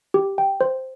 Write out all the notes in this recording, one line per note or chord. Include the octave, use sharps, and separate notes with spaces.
G4
G5
C5